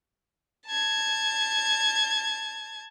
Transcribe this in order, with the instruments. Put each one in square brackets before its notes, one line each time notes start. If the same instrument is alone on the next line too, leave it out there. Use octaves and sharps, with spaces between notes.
[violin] A5 G#6